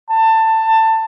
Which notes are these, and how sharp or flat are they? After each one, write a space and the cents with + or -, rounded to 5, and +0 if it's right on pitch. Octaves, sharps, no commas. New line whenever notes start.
A5 +20